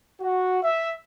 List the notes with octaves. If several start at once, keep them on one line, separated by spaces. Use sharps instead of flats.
F#4
E5